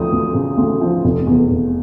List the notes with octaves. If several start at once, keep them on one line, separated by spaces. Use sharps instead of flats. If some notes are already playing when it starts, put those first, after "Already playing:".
Already playing: D2 C#3 F3 D#6
D2
C#3
D2
F3
F1
E2
F1